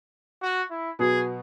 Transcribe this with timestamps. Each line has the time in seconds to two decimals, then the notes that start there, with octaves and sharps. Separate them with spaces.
0.42 F#4
0.70 E4
0.99 B2 F#3 B3 G#4